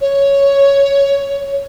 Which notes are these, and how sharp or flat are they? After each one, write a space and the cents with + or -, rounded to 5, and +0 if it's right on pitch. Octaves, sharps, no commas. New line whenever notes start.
C#5 +5